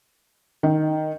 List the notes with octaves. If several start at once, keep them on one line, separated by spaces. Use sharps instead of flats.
D#3